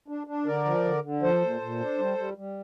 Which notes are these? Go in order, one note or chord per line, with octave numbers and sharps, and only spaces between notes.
D4
D4
D3 A#4 D5
F3
D3
D3
F3 A4 C5
A#2
A#2
D4
G3
G3
G3